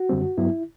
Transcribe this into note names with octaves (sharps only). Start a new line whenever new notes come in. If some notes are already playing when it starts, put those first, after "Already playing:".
Already playing: F#4
F#2 D3 G3 C4
G2 F#3 B3 E4